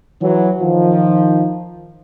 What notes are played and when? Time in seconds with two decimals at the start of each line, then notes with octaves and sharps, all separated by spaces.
0.21 E3 F#3
0.61 D#3 F3